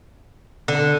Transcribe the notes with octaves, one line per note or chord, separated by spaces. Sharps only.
D3